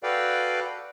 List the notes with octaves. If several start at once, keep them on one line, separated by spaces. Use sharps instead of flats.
F#4 A4 B4 D5 F5 G5